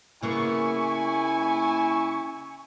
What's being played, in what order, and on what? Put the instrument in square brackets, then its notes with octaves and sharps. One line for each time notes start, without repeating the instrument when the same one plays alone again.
[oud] C#3 A#3 B3 [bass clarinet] E4 [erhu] G#5 [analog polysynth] C#6